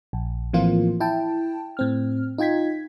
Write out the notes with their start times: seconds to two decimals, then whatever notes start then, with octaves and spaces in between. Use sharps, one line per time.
0.13 A#1
0.53 A2 E3 F3 A#3 C4 F4
1.00 E4 G5 A5
1.77 A2 C4 F6
2.38 D#4 F4 G5 G#6 B6